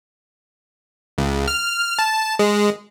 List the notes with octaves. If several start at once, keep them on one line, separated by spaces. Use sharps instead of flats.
C#2
F6
A5
G#3